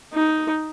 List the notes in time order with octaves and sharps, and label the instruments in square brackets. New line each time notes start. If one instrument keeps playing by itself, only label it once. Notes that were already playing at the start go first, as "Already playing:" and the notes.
[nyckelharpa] D#4